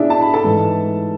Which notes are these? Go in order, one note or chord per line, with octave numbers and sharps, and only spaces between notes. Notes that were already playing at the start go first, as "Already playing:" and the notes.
Already playing: B2 D4 E4 G#4 D5 E5
A5
B5
A4 A5
G#2 E3 A3